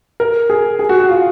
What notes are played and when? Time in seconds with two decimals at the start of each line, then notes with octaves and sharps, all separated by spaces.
0.20 A#4
0.50 G#4
0.79 G#4
0.89 F#4
1.00 F#4
1.09 F4